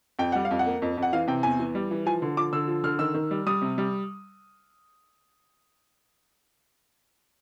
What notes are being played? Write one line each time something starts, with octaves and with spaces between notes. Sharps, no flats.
F2 G5
G3 F#5
F5
F2
F#5
A#3
F2
F2
F#5
E3 F5
C3 G5
E2 G#5
E3
G3
E3
F3 G#5
D3
F3 D6
D3 E6
F3
D3 F6
D#3 E6
D#3
G3
G3 D#6
C3
G3